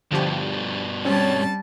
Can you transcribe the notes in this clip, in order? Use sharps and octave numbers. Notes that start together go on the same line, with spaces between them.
G2 B2 D3 F3 G4
G3 C4 C#4 C#5 A5